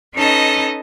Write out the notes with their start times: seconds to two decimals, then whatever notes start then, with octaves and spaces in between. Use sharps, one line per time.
0.15 C#4 D#4 A4 B4 D#5 A5